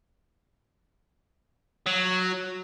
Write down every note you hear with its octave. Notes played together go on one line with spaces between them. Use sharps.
F#3